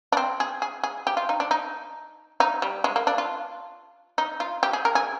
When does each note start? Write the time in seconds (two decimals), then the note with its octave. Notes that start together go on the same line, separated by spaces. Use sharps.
0.12 D4
0.17 C4
0.40 G#4
0.62 G#4
0.83 G#4
1.07 G4
1.17 F4
1.29 D#4
1.40 D4
1.51 D#4
2.40 D#4
2.62 G3
2.84 G#3
2.96 A#3
3.07 D4
3.18 F4
4.18 D#4
4.40 F4
4.63 G4
4.73 G#4
4.85 A#4
4.95 G#4